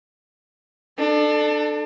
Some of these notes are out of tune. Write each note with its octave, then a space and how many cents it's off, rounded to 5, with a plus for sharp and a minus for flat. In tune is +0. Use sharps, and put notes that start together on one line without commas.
D4 +30 A4 +0